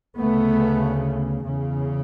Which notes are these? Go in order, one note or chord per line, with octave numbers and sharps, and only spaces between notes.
D2 C#3 A3 B3
E2 C#3